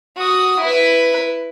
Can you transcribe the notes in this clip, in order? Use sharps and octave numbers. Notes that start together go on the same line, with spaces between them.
F#4 D#6
E4 B4